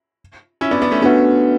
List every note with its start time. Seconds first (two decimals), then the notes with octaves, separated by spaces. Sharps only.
0.61 C#4 E4
0.71 B3 D4
0.82 B3 D4
0.91 A3 C#4
1.02 A3 B3 C#4 D4 F#4 B4 F#5